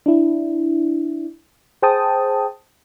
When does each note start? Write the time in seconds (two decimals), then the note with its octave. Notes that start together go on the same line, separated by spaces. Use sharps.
0.06 D4 E4
1.82 G#4 C5 G5 A5 D#6